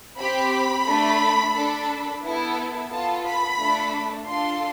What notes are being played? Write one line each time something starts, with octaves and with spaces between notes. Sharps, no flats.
C4 G4 B5
A3 D4 A4
D4 A4
B3 E4 A4
B3 F4 A4 A5
B5
A3 D4 A4
D4 F4 A4 C6